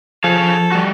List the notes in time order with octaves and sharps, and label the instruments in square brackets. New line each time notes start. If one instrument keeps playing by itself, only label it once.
[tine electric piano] F3 [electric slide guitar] G#4 F5 [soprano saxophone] A4
[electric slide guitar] G3 F#4